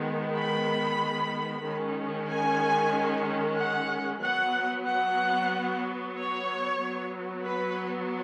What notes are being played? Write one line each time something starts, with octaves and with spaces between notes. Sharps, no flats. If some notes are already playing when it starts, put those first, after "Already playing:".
Already playing: D#3 G#3 B3
B5
D#3 G#3 C#4
G#5
F#5
F#3 B3 F#5
F#5
C#5
F#3 B3
B4